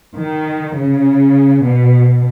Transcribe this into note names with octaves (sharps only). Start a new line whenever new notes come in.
D#3
C#3
B2